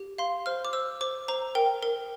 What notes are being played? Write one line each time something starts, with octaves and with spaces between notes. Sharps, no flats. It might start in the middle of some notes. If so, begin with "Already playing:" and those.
Already playing: G4
F5 C6
C5 F6
D6
C5 E6
C5 D6
C5 A#5
A#4 G5
A#4